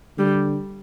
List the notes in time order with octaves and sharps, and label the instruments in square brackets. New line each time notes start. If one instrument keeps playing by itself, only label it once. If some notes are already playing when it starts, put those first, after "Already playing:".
[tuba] D3 [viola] G3